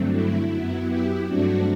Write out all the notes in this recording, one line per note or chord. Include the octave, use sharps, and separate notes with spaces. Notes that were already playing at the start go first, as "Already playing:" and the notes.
Already playing: G2 D3 F#3 A3 C4
E4
F#2 F#3 B3
E4 G4
G2 F#3 A3 C4 D4 F#4